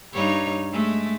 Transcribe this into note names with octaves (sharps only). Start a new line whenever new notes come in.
G2 D#4 C#5
G#3 A3